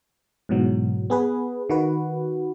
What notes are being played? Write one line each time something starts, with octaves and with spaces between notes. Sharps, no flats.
G#2 B2 E3 F#3
B3 G#4 B4
D#3 F#4 B4